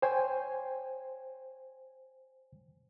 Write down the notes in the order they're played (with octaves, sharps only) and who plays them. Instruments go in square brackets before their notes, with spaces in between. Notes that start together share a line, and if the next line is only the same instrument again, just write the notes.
[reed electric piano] C5 C#5 G5 G#5 C6